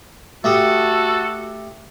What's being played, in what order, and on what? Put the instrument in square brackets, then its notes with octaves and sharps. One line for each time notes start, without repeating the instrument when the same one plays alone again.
[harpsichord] A3 G4 D#6 [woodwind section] F#4 A4